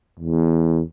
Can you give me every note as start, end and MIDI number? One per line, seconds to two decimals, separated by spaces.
0.19 0.82 40